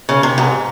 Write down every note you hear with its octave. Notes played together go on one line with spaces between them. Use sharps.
C#3
C3
G#2